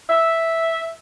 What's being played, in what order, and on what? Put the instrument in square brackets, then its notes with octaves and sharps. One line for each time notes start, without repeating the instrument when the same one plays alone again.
[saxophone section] E5